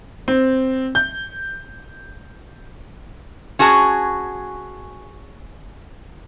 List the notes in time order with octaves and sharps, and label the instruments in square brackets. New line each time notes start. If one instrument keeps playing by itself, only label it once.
[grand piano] C4
G6
[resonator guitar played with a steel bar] C#4 F#4 G#4 A5